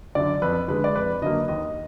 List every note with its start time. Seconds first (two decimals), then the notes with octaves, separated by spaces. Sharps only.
0.15 F#2 D3 D5
0.42 F2 B4
0.68 D3 G#3 B4
0.84 D5
0.95 F2 B4
1.22 D3 F#3 A#3 D#5
1.48 D#2 D#5